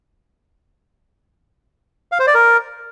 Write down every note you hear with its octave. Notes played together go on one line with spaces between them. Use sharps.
F5
C5
D5
A#4